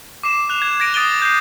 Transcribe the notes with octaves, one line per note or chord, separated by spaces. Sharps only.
D6 C7 E7
F#6 F7
G#6
G#6 A#6 D7 D#7
D#6 A6 D7 D#7 G7
G6 C7